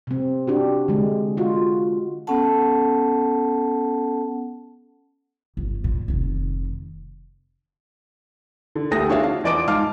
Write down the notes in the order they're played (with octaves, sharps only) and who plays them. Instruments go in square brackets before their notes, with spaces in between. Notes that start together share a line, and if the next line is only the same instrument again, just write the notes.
[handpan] C3 C4
D4 F#4 G4
D3 G#3
G#3 F4 F#4
[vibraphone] B3 C#4 A4 F#5 A5
[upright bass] G1
A#2
F1 D#3
[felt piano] D3
D2 A3 G4 D#6 A#6
D4 F#4 G#4 C#5 E5 F5
D4 F5
E2 F3 D5 D#5 D6 D7
G#2 F5 A5 D6 F6